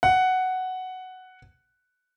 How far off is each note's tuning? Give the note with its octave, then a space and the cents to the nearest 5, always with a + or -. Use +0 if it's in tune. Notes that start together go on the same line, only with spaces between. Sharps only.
F#5 +5